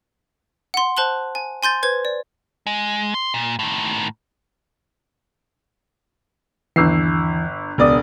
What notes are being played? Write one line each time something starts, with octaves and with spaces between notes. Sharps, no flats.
F#5 C6
C5 A5 F#6 F#7 G7
G#5
G#5 C6 G6 A6
B4 C5 G#6
D5
G#3
C6
A#2
A2 D#3
G1 D#2 E3 E6 C7
E1 C#2 B3 D5 D#6